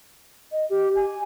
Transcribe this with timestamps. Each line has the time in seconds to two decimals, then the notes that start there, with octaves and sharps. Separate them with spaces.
0.52 D#5
0.70 G4
0.96 G#5